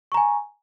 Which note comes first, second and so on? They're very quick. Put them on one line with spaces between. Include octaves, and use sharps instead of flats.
C#6 A#5 G#5